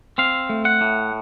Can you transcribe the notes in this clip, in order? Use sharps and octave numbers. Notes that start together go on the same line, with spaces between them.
C4 F5
A3
F#5
A2